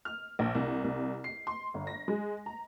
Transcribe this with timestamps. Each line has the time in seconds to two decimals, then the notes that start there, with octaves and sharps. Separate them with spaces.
0.05 F6
0.39 A#1
0.55 C2
0.84 C2
1.24 C7
1.47 C6
1.74 G1
1.87 A#6
2.08 G#3
2.46 A#5